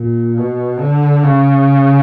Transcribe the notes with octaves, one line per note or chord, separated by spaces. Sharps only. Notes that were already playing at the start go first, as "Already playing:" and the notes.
Already playing: A#2
B2
D3
C#3